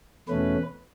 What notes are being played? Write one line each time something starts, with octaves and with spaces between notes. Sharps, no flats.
E2 B2 A3 C#4 B4